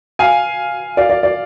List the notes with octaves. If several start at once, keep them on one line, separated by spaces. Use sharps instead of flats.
F5 G#5
D5 F5
D5
D5